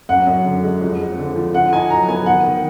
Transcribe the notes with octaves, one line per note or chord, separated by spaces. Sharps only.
F#2 F#5
F#2
D3
G#3
F2
G#3
D3
F3
D3 F#5
D#4 G#5
F#3 A#5
B3 G#5
D#3 F#5
D#3